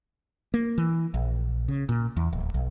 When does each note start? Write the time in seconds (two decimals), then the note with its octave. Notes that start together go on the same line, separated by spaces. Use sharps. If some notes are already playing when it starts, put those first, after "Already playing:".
0.54 A#3
0.78 E3
1.14 A#1
1.68 C#3
1.89 A#2
2.17 E2
2.33 D1
2.54 B1